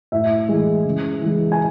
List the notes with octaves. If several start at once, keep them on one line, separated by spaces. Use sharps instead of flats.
A2 E5
E3 G#3
C#3
E3 G#3
G#5